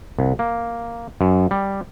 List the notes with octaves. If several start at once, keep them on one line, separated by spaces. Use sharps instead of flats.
C2
A#3
F#2
G3